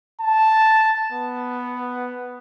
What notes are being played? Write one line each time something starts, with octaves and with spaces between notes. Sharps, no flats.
A5
B3